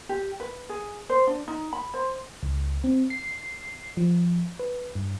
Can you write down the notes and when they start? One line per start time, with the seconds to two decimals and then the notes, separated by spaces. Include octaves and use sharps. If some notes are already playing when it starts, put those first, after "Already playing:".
0.09 G4
0.40 B4
0.69 G#4
1.10 C5
1.27 D4
1.48 D#4
1.73 B5
1.94 C5
2.43 C#2
2.84 C4
3.10 C7
3.97 F3
4.59 B4
4.95 G2